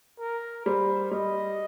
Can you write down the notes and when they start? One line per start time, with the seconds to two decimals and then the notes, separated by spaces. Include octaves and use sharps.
0.19 A#4
0.66 G3 C5
1.11 G3 D#5